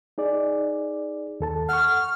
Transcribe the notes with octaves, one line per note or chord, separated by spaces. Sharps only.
D#4 G#4 D5
D#2 A4 A5
F#5 C#6 F6